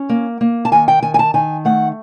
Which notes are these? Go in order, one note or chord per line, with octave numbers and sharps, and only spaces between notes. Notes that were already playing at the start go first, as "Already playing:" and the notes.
Already playing: C#4
A#3
A#3
A5
D#3 G#5
G5
D#3 G#5
G#5
A5
D#3 G#5
A3 F#5